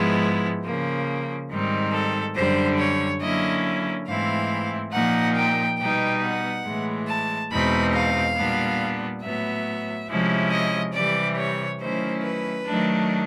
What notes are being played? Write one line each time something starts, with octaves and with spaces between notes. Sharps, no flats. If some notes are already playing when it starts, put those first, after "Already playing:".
Already playing: G#2 F3 G#3 B3 E4
C#3 F3 A#3
G#2 D#3 G3 C4 D#4
A4
F#2 D3 G3 C5
C#5
D3 F#3 A#3 C#4 E4 D#5
G#2 E3 A3 C4 E4 F5
A#2 F3 A#3 D#4 F#5
G5
B2 G3 B3 D#4 G5
F#5
A2 E3 G#3
A5
E2 B2 G#3 C4 D#4 B5
F5
A#2 G3 B3 D4
A2 F#3 B3 E5
C3 F3 G#3 C#4 E4
D#5
C3 E3 G3 D5
C#5
D#3 F#3 A3 C#4 E4 C5
B4
D#3 F#3 A3 D4